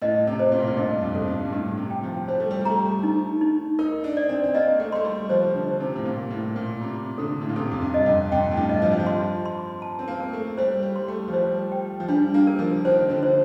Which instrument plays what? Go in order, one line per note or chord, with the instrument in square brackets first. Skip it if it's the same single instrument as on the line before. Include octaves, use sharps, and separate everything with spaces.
[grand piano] A2 [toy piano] D#5
[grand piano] C3
[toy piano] C5
[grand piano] A#2
A2
A#2
[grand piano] G2 [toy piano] D#5
[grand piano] F2
[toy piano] A4
[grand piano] G2
G2
[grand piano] A2 [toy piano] G4
[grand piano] C3
[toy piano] G5
[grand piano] F3
[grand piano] G3 [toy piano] C5
[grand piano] A3
G3
G3
[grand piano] A3 [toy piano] A#5
[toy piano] D#4
D#4
[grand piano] D#4 [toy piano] A#4
[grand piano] D4
[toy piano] D5
[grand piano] C4
C4
[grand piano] A#3 [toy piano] D#5
[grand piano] A3
[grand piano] A3 [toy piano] C6
[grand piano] G3
[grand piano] F3 [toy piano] C5
[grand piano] D3
[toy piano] C5
[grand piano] C3
A2
[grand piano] A#2 [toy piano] A#4
[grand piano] A2
[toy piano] A#4
[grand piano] A#2
[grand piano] C3 [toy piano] F4
[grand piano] D3 [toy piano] A4
[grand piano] A2
A#2
[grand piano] C3 [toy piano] A4
[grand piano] F2
G2
[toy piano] D#5
[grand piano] F2
[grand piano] F2 [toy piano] G5
[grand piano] A2
G2
[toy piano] D#5
[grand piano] F3
G3
F3
[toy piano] C6
C6
A5
[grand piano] C4
A#3
[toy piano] A#4
[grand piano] A3
[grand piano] G3 [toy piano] C5
[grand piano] G3
[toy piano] C6
[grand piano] A3
F3
[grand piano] G3 [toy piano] C5
[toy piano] G5
[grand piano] F3
[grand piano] G3 [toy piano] D4
[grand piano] A#3
[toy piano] A#4
[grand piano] F3
[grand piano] D#3 [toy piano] C5
[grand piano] D3
[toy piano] C5